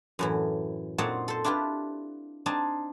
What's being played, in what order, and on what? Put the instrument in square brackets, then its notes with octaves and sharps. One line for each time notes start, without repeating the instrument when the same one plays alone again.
[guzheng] F#2 A2 E3
A#2 C4 D#4 C#5 F#5 A5
A4 C5
D4 E4 F4 G4 B4
C4 D4 D#4 G#5 A5